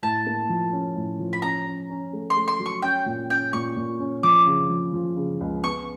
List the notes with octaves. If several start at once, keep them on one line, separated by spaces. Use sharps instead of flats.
A2 A5
A#3
F3
C#4
A2
F3
B5
C#4 A#5
C#4
C#4
A3
C6
A3
C6
F#3
C#6
C#4 G5
A#2
C#4 G5
A#2 C#6
A#2
C#4
F3 D6
C#3
F3
F3
C#3
C#2
B3 C#6